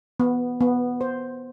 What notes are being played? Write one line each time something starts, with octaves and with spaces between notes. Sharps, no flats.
B3
B3
C5